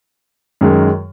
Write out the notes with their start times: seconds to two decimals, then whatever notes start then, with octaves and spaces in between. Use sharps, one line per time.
0.61 F#2 D#3 G#3